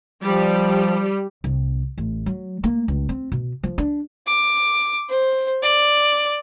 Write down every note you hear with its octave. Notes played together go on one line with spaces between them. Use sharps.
F3 G3
C2
A1
F#3
A#3
C#2
C4
B2
F3
D4
D6
C5
D5